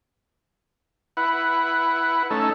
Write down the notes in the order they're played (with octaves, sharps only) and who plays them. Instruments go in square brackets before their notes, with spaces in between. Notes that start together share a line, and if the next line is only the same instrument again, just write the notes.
[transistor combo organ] E4 B4 F#5
A3 C#4 D#4 A4